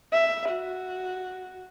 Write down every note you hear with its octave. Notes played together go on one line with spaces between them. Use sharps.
E5
F#4